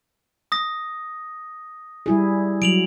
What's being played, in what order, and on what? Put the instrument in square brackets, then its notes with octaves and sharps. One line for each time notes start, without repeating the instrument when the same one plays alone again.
[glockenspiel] D#6 A#6
[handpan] G3 E4 G#4
[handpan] F#3 [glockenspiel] D7 F7 F#7